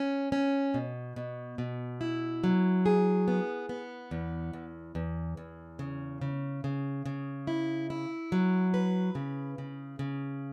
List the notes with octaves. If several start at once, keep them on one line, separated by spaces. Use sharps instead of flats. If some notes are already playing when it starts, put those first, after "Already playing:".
Already playing: C#4
C#4
B2
B2
B2
E4
F#3
G#4
B3
B3
E2
E2
E2
E2
C#3
C#3
C#3
C#3
E4
E4
F#3
B4
C#3
C#3
C#3